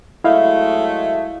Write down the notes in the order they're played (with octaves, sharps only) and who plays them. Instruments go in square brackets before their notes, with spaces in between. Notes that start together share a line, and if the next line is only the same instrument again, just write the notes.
[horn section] F#3 G#3 A3 [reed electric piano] E4 D#5 F5